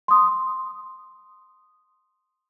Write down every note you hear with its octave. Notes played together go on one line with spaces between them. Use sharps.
C6 D#6